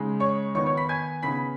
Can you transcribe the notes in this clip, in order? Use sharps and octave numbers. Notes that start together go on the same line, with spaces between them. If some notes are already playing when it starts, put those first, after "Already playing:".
Already playing: C#3 G#3 D#4
C#5 C#6
D#3 B3 D#4 C#5 C#6
C#5 C#6
B5 B6
G#5 G#6
C#3 B3 D#4 B5 B6